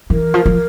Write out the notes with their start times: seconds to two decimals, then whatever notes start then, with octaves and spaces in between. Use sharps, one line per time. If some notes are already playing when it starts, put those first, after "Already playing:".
0.10 E3 A#4
0.34 F3
0.46 F3